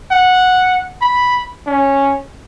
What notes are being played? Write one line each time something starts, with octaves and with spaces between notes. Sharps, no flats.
F#5
B5
C#4